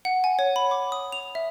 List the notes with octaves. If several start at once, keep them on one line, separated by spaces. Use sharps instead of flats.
F#5
G#5
C#5
B5
D6
D#6
F7
E5